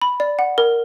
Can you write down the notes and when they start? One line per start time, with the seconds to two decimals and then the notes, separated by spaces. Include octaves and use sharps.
0.02 B5
0.20 D5
0.39 F#5
0.58 A#4